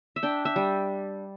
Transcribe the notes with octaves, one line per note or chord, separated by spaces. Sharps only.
E5
D4 G5
E5
G3